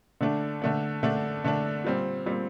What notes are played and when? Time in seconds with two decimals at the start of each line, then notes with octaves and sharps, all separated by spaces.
0.21 D3 A3 D4
0.62 D3 A3 D4
1.03 D3 A3 D4
1.44 D3 A3 D4
1.84 A#2 G3 C4
2.26 A#2 G3 C4